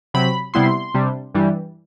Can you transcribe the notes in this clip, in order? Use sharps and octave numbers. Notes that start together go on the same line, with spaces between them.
C3 F#3 C4 B5
C3 G3 B3 E4 C6
C3 G3 D4
G2 E3 G3